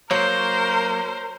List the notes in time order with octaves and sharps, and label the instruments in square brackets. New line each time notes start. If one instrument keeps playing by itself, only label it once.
[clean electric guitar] F#3 A#3 [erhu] A#4 [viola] C5 [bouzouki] C#5